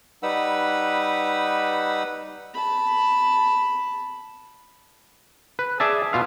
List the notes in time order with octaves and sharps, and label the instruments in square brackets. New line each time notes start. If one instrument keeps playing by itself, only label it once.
[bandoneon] G3 D#4 B4 F#5 B5 E6
[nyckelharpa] A5 B5
[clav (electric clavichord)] B4
G#4 D5 E5 A5
B2 F4 F5